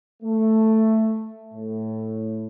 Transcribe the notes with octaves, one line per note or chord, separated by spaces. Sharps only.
A3
A2